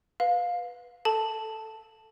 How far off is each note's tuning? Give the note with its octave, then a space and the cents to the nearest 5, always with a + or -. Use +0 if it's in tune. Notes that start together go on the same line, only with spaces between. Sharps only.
B4 +0 F5 +20
A4 +0 A5 +0